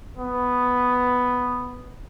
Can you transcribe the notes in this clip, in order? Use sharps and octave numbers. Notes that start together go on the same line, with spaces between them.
B3